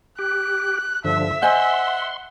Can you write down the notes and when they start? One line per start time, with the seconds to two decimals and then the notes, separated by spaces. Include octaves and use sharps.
0.19 G4 F#6
1.05 G2 D3 F3 E5
1.42 C5 D#5 F#5 G#5 C6